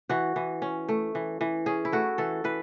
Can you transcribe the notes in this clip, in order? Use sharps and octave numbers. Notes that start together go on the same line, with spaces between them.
E3 F#4
E3
C#4
A3
E3
E3
C#4 G#4
E4
A3 F#4
E3 A4
E3 B4